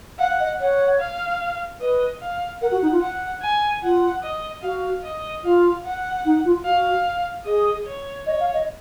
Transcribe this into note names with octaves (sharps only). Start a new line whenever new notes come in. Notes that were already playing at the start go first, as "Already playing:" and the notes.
F5 F#5
D#5
C#5 F#5
F5
B4 D#5
F5
A#4 F#5
F#4
D#4
F4
F#5
G#5
F4 F#5
D#5
F#4 F5
D#5
F4 F5
F#5
D#4
F4
F#4 F5
G#4 D#5
C#5
C#5 D#5
F5
D#5